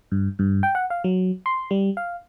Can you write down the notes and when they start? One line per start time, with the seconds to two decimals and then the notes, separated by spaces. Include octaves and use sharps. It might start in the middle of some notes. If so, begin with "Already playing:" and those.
0.12 G2
0.39 G2
0.63 G5
0.75 F#5
0.90 F5
1.04 F#3
1.46 C6
1.71 G3
1.97 F5